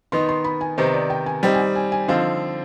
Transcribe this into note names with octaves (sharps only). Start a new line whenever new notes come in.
D#3 B3 D#4 C6
C6
B5
G#5
C3 D#3 B3 D#4 C5
D5
G5
G#5
G3 C4 D#4 G5
G#5
G5
G#5
G#5
D3 F3 C4 D#4 F5